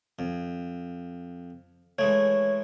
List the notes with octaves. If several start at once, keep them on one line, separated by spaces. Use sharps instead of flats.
F2
E3 G#3 A3 C#5